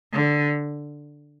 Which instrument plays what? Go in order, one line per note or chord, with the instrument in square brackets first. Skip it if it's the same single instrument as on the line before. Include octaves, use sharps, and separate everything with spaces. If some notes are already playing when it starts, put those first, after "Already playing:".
[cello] D3